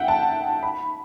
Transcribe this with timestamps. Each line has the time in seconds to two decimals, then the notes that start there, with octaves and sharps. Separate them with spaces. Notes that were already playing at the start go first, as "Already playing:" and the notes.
Already playing: E5 F#5 G5
0.08 A5
0.63 B5